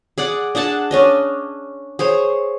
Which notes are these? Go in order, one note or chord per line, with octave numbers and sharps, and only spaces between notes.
G#4 D5 F#5
D4 G#4 F#5 A5
C#4 D4 D#5
G#4 C5 C#5